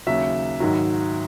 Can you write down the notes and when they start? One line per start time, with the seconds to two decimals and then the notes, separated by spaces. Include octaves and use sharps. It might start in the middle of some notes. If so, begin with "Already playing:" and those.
0.07 D#2 C#3 F#3 E5
0.60 G#2 D#3 F#3